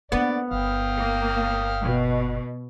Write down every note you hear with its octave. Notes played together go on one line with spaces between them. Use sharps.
A#3 B3 D4 D5
G1 F5 G5 D#6
A#3
B2